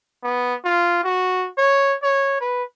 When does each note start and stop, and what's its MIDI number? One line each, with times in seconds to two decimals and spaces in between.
0.23 0.55 59
0.65 1.00 65
1.04 1.48 66
1.58 1.96 73
2.03 2.37 73
2.41 2.64 71